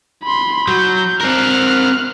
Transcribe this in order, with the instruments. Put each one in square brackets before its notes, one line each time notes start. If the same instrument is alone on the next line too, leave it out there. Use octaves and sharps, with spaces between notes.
[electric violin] B5 C6
[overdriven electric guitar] F#3 [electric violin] G6
[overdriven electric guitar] C4 A#4 [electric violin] F6 F#6